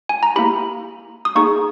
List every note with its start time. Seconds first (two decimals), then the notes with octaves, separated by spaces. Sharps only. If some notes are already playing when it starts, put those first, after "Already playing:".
0.09 G#5
0.23 A#5
0.36 A#3 E4 G4 B5
1.25 D#6
1.35 A#3 D#4 G#4 C#6